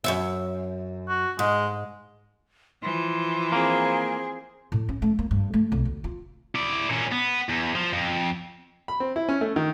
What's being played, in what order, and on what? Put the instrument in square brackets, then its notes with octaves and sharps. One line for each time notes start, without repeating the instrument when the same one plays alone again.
[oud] F#2 C#5 E5
[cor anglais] F#4
[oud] G#2 [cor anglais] G#3
[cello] E3 F3 [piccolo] C6
[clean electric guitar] A#3 [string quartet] C4 G#4
[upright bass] A2
C#4
A3
A#3
G2
A3
B1
D2
F4
[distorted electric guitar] E4 D5
A#2 C#4
B3
E2
F3
F2
[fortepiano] B5
C4
E4
C#4
A3
D#3